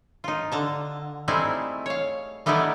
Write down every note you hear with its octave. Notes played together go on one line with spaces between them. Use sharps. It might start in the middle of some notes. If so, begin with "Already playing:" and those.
D#4 F4
D3 A5 A#5
G3 A3 C4 D#4 E4 G#4
C#5 F5
G3 A3 B3 D#4 E4 D5